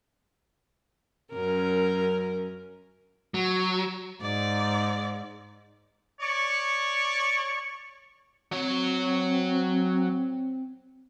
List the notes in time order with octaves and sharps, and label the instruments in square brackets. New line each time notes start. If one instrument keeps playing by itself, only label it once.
[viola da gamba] F#2 C#4 A#4
[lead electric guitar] F#3
[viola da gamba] G#2 [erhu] D5
[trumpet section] C#5 D5 C#6
[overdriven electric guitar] F#3 C#5 [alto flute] C4